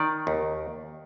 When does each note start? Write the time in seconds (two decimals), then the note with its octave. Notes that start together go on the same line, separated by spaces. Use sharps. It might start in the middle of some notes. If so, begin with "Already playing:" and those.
Already playing: D#3 D5
0.27 D#2